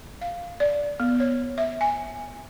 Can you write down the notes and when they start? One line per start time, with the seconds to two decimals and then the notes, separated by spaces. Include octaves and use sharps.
0.21 F5
0.60 D5
1.00 B3
1.20 C#5
1.58 E5
1.81 G#5